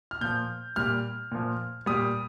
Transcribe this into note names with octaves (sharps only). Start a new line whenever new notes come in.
F6
A#2 F3 G6
A#2 G3 F6
A#2 F3
A#2 G3 D#6